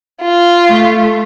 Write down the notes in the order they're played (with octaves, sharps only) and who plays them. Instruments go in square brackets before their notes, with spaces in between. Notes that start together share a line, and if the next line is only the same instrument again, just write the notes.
[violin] F4
[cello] A3